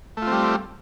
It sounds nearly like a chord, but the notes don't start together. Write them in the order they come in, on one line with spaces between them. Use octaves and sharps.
A3 F4 C4 G3